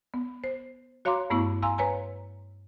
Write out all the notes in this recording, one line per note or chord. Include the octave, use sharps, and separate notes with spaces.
B3
C5
F#4 C#5 F5 A#5 C6 D6
G2 A3 B3 E4 C#6
F5 G#5 A#5 C6 E6
B4 C#5 G#5 A#5